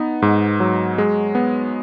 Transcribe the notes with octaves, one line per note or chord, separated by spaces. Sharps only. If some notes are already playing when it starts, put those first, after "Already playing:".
Already playing: B3 D#4
G#2
F#3
G#3
B3